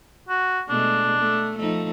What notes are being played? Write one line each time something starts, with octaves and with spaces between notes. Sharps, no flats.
F#4
B2 G#3 A3 D4
A3
F3 A3 D#4